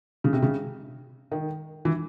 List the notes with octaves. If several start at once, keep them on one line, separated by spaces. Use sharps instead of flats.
C#3
C3
C#3
D#3
E3